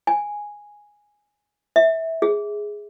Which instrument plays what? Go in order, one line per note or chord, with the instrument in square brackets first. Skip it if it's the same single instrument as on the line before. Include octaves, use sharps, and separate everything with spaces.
[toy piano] G#5
E5
G#4